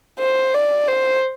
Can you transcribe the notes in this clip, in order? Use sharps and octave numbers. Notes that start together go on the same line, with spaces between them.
C5
D5
C5